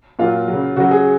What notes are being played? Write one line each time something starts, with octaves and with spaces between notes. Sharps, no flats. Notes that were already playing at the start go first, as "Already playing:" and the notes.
A#2 F#3 F4
C#3 F#3
C#3 F#3 F#4
G#4